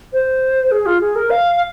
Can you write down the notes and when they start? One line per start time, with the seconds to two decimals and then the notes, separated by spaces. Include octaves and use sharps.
0.13 C5
0.71 G#4
0.86 F4
1.01 G#4
1.16 A#4
1.30 F5